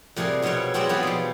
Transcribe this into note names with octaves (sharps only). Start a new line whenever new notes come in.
F2 C3 G3 G#4 A#4
F2 B2 C#4 E4 C#5
F#3 G#3 C4 E4 G#4 D5
E3 B3 F4 G4 G#4
B2 F3